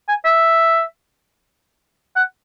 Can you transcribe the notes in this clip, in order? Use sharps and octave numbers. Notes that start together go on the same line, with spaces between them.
G#5
E5
F#5